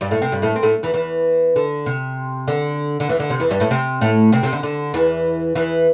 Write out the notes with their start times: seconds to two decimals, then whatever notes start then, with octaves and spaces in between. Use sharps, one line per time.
0.01 G2 G3
0.11 A2 A3
0.22 C3 C4
0.32 G2 G3
0.42 A2 A3
0.55 C4
0.63 A2 A3
0.83 E2 E3
0.93 E2 E3
1.56 D3
1.86 C3
2.48 D3
3.00 D3
3.09 E2 E3
3.20 D3
3.30 C3
3.40 E2 E3
3.51 G2 G3
3.60 A2 A3
3.71 C3 C4
4.01 A2 A3
4.32 C3 C4
4.43 C3
4.53 D3
4.63 D3
4.94 E2 E3
5.55 E2 E3